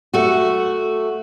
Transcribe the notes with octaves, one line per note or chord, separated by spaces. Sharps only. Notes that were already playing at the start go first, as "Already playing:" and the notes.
A3 F#4